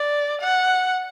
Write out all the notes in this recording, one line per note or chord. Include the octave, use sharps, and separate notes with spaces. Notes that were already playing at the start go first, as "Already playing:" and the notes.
Already playing: D5
F#5